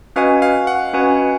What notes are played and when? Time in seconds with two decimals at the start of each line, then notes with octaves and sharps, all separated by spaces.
0.16 C#4 F#4 B4 D#5 F5 G#5
0.42 F5
0.67 F#5
0.93 C#4 F#4 B4 D#5 G#5